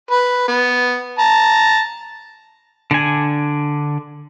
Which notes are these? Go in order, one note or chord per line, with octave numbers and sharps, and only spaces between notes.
B4
B3
A5 A#5
D3 D4 G#5